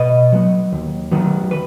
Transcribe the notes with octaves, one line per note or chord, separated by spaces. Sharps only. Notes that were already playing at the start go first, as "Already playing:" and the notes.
Already playing: B2 B4 D#5
F#3 B3
D#2
D#3 F#3 B3
B4